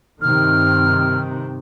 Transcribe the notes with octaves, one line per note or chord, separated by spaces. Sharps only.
G2 C3 D#3 F6